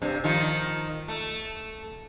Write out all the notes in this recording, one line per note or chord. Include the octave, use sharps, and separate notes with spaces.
G2 C3
D#3 F3 F4
A3